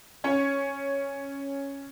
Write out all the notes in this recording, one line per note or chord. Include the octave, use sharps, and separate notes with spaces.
C#4 C#5